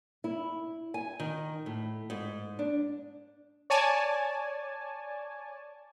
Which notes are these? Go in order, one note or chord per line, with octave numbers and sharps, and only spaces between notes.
E4
G#5
D#3
A2
G#2
D4
C#5 D5 G#5 A5